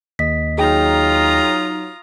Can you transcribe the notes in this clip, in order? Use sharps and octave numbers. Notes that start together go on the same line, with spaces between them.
D#2 D#5 B6
F#3 D#4 F4 G#4 G5 A#5 D#6